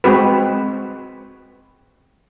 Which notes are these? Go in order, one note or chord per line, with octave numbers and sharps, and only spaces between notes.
G#3 C4 F#4 B4